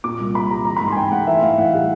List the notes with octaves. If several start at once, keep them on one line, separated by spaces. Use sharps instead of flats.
A#2 D6
C2
C2 B5
G3 A#5
E3 A#5
B5
G#2
C6
G#5
G#2 G5
A3 F#5
E3 E5
A2 F5
A2 F#5
G3 F#5